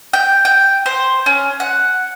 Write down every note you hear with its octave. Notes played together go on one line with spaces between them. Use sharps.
G5
G5
C5
C#4
F#5